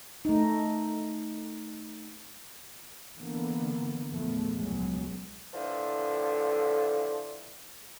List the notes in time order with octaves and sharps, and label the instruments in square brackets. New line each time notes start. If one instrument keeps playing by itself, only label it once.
[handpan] A3 D#4
[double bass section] D3 E3 A#3 B3
E2 A#2 F3 A3 B3
C#2 B2 F#3 G#3
[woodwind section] A2 D3 E3 F3